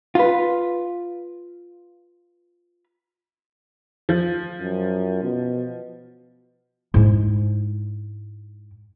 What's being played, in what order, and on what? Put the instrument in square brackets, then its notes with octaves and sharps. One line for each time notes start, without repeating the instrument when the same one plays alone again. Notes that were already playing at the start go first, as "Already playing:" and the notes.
[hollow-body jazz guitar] F4 B4
[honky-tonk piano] F3
[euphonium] F#2
B2
[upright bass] G#2 E4